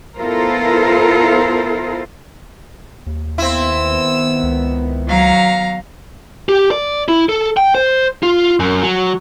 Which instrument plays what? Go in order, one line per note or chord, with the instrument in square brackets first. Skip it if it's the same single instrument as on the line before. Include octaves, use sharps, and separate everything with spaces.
[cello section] B3 E4 F4 A4 A#4 C5
[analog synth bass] D#2
[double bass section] D#3 B3 [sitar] C4 E4 [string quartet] E6
[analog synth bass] C#2
[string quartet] F#3 F5 A#5
[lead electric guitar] G4
D5
E4
A4
G5
C5
F4
F#2
F#3